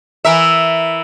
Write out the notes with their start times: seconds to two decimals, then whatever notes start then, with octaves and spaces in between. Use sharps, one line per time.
0.25 E3 A#4 E5